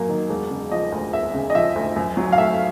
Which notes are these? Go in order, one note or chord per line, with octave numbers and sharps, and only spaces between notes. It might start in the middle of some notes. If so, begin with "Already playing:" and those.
Already playing: F#2 F#3 A#3
D#3
E1
C#3
F3 D#5
D2
E1 E5
C#3
D#5
F3 E5
D2
F#2
F#3
F5
A3 E5